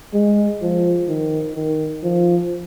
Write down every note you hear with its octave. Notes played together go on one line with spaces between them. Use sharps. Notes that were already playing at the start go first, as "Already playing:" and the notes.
G#3
F3
D#3
D#3
F3